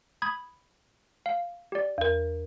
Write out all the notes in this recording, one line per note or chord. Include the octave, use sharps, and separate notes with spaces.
B5 D#6 G#6
F5
G4 D5
E2 A#4